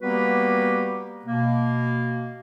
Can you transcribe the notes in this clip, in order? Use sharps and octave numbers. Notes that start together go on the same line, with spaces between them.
G3 A#3 B3 F#4 G4 B4
B2 A#3